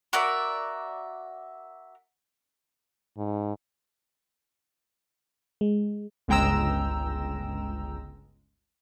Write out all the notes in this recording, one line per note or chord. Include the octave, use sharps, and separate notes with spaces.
F#4 A#4 D5 E5
G#2
G#3
G1 C#2 G#3 G5 A#5 E6